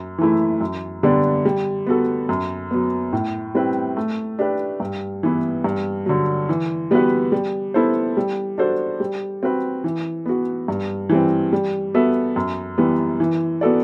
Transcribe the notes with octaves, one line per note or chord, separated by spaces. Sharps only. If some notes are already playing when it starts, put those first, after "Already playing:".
Already playing: F#2
E3 A3 E4
F#2
D3 G3 B3 D4
G3
B3 F#4 A4
F#2
F#3 B3
A2
G3 C4 E4 B4
A3
D4 G4 B4
G2
E3 B3 E4
G2
D3 F#3
E3
G3 B3 F#4 B4
G3
B3 E4 A4 C5
G3
D4 F#4 A4 C5
G3
C4 F#4 B4
E3
B3 F#4
G2
E3 G3 C4
G3
B3 F#4 A4 E5
F#2
E3 G3 B3
E3
B3 F#4 A4 D5